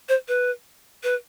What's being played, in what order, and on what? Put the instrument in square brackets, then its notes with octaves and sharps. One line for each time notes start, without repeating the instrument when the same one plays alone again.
[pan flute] C5
B4
B4